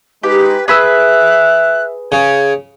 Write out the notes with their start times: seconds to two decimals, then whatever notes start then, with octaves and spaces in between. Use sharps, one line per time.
0.23 G#3 D#4 G4 B4
0.68 G#4 B4 E5 E6 F#6
2.12 C#3 G#6